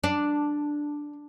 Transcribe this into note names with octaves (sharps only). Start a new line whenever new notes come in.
D4